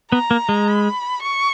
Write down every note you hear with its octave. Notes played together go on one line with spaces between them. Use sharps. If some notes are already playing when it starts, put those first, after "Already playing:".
B3 A#5
A#3
G#3
B5
C#6